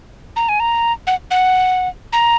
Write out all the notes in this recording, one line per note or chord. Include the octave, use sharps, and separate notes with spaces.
A#5
G#5
A#5
F#5
F#5
A#5